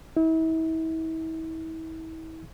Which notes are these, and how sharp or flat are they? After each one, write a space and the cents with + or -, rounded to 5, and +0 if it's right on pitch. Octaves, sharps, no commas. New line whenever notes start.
E4 -40